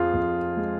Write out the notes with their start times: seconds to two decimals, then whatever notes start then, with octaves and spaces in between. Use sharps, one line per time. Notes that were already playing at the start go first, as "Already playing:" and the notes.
Already playing: F2 F3 F4 G#4
0.14 F2
0.57 G#3